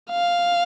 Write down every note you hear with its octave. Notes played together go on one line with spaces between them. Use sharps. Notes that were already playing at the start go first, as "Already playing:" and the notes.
F5